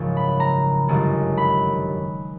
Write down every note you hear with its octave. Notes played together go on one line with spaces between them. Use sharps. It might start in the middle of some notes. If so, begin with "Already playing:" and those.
Already playing: G#1 F#2 C#3 F3
B5
A#5
G1 F#2 D#3 G#3
B5